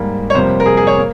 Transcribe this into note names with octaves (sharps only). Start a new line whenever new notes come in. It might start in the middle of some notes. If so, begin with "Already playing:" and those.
Already playing: G#2 G3 A#3
C#5
F2 C3 G3 A#3 C5
A#4
G#4
G#4
C#5
A#3